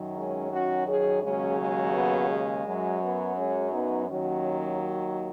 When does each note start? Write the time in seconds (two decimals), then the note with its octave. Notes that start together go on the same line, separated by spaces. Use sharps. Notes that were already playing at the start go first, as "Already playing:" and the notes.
Already playing: F#2 D#3 F#3
0.16 G#3 C#4
0.52 C#4 F#4
0.88 G#4 C#5
1.23 D#2 C#3 F#3 G#3 C#4
1.59 G#3
1.94 B3
2.31 G#3
2.66 F#2 F#3
3.01 B3
3.37 G#3 C#4
3.72 B3 D#4
4.08 D#2 D#3 F#3 C#4 F#4